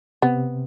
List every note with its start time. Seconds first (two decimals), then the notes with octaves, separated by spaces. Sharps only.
0.22 C3 B3